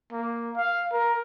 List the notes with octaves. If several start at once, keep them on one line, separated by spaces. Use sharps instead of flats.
A#3
F5
A#4